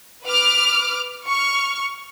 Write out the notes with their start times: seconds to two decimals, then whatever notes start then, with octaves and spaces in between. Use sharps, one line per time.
0.24 B4 D6 F6
1.26 C#6 F6